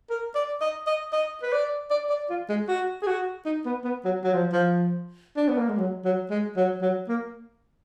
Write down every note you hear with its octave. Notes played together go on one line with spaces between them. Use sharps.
A#4
D5
D#5
D#5
D#5
B4
D5
D5
D5
F4
G#3
F#4
G#4
F#4
D#4
B3
B3
F#3
F#3
F3
F3
D4
B3
A#3
G#3
F#3
F#3
G#3
F#3
F#3
A#3